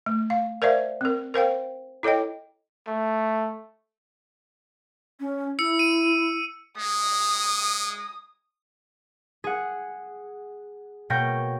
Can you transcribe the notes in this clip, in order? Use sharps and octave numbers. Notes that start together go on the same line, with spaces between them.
A3
F5
A#4 C5 D5 E5 F5
C4 A#4
A#4 C5 F5 G5
E4 A4 C#5 D#5 G5
A3
C#4
E4 E6 C#7
D#7
G#3 D#6
G#4 F#5
B2 A#3 C#5 G5 G6 A#6